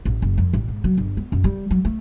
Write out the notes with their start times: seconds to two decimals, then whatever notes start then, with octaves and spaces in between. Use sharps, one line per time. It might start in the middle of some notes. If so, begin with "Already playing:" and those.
0.05 A1
0.22 F#1
0.38 F2
0.53 A1
0.68 G#2
0.84 F#3
0.97 G1
1.17 B3
1.32 F#2
1.44 G3
1.71 F#3
1.85 A3